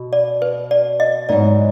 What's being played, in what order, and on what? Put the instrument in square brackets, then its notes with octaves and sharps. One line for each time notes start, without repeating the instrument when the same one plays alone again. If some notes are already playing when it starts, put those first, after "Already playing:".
Already playing: [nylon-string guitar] B2
[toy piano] D5
B4
D5
D#5
[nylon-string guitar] G#2 F#3 B3 D#4 [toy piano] D5